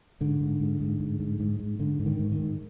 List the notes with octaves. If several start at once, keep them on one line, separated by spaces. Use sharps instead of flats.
G#2 D3
G#2
G#2
G#2
G#2
G#2
G#2
G#2
G#2 D3
G#2
D#3
G#2
D#3
G#2